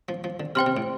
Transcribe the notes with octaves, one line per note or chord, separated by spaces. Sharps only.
F3
F3
D3
C3 C5 G5 C6 F6
C3
A2